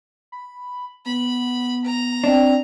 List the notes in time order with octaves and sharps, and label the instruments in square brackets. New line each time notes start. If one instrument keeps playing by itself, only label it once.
[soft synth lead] B5
[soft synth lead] B3 [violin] B5
[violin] A#5
[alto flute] C4 [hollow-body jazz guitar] D4